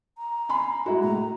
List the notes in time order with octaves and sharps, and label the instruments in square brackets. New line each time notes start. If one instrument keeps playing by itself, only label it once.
[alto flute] A#5
[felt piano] G#5 B5 C6
G#3 E4 F#4
[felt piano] A2 [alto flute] A#5